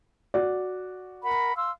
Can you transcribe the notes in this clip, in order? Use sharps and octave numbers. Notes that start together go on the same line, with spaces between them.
F#4 D5
A#4 F#5 B5
F5 C6 E6